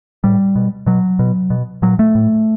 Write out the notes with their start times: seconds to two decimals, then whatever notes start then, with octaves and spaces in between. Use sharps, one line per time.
0.24 A2 G3
0.56 B2
0.86 B2 F#3
1.19 B2
1.50 B2
1.82 A#2 F#3
1.99 A3
2.15 A2